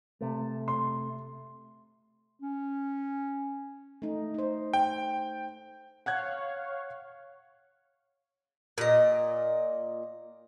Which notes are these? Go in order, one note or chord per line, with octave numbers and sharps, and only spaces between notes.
C3 A3
C6
C#4
A3 D#4
D#4 C5
G5
C#5 F5 F#5 F#6 G#6
A#2 D#5